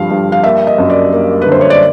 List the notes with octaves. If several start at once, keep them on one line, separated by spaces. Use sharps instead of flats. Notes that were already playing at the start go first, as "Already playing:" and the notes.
Already playing: G2 D3 F3 F5
G2
F5
A#3 E5
D#5
F#2
D5
A#3
B4
D3 C5
C#5
D5